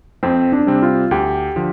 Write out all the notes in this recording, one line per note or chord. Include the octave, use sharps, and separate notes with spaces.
F2 C4
D4
C3 G3 C4
F4
D2 G4
D3 F3